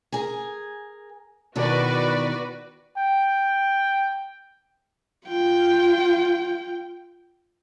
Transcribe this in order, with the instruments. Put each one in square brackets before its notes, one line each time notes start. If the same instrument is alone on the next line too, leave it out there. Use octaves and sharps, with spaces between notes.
[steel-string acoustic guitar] G#4 A#4 G#5
[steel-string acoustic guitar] E2 B2 D#3 [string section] F#4 B4 D5
[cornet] G5
[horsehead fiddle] F4 G5